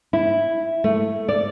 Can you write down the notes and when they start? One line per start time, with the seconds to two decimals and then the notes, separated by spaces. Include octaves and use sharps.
0.13 E4
0.84 A3
1.29 D5